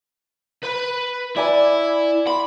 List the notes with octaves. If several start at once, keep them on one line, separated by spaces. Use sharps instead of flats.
B4 B5
E4 D5 G#5 B5
B5 C6